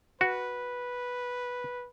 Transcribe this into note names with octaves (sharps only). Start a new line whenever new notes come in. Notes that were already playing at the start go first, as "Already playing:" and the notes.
F#4 B4